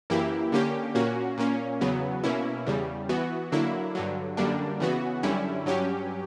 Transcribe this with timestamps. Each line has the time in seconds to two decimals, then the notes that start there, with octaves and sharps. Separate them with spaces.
0.10 F#2 E3 A#3 E4 G4
0.52 D3 A#3 C#4 G4
0.95 A#2 A#3 C#4 F#4
1.38 A#2 A#3 C#4
1.81 E2 C#3 F#3 B3
2.24 B2 A#3 C#4 E4
2.67 E2 C#3 G3
3.09 E3 B3 F#4
3.52 D3 F#3 A#3 E4
3.95 G2 D3 F#3
4.37 F#2 D3 G3 A#3 D4
4.80 C#3 E3 B3 F#4
5.23 F#2 D3 G3 C#4 E4
5.66 G2 F#3 C#4 G4